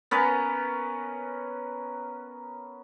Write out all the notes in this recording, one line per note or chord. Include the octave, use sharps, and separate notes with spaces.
B3 C#4 A#4 B4